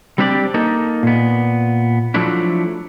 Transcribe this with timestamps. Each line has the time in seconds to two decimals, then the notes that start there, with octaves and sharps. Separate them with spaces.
0.18 G3 C4 D4 G4 B4 D5
0.54 A#3 D#4 A4
1.03 A#2 B3
2.14 F3 F#3 A3 D4 E4